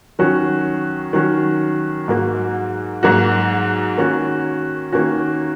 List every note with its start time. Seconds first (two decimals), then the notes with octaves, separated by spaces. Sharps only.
0.19 D#3 F#3 C#4 F#4
1.13 D#3 F#3 C#4 F#4
2.08 G#2 F#3 A#3 F#4
3.03 G#2 F#3 A#3 F#4
3.97 D#3 A#3 C#4 F#4
4.92 D#3 A#3 C#4 F#4